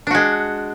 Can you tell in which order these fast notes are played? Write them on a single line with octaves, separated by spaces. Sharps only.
D4 F#4 G#3